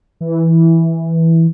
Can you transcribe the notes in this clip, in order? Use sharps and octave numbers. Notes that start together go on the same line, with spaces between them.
E3